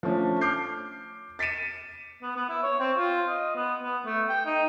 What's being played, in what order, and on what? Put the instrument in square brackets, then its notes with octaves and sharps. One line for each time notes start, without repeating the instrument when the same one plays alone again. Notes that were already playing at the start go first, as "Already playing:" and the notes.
[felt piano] F3 A3 C#4 D4
D6 F6 G6 C7
A6 B6 C#7 D#7 E7
[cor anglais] B3
B3
E4
C#5
C4
F4
D#5
B3
B3
A3
G5
D#4